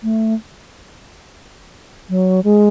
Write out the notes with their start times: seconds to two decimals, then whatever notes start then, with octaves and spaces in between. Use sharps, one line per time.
0.03 A3
2.09 F#3
2.44 G#3